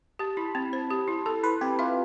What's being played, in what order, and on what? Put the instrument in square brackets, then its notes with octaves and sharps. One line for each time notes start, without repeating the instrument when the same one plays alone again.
[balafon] G4 [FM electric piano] A5
[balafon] E4 [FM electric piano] B5
[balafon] C4 [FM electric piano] A5
[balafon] C5
G4
E4
[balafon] A4 [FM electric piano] A5
[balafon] E4 [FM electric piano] B4
[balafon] C4 [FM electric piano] G4
[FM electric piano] F4 [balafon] E5